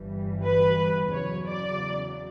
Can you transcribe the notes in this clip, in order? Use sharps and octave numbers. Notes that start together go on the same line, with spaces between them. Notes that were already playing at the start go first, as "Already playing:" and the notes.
Already playing: G1 G2 E3 G3
B4
E2 C#3 F#3 C#5
D5